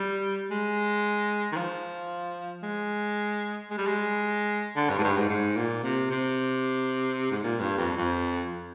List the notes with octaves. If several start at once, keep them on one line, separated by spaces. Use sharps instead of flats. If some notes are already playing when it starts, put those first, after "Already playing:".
Already playing: G3
G#3
D#3
F3
G#3
G#3
G3
G#3
D3
G2
G#2
G2
G#2
G#2
A#2
C3
C3
G#2
A#2
G2
F2
F2